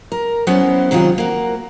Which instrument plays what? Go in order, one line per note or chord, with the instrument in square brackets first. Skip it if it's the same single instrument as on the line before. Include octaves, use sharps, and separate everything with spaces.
[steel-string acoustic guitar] A#4
F#3 B3 C#4 E4 F#4 C5
C3 D#3 F#3 F4
A#3 F#4